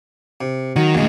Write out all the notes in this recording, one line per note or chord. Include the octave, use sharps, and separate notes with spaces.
C3
D#3 F#3
D#2 A2 C#3 G#3